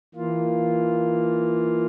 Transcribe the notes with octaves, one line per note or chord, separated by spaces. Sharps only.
E3 A#3 F4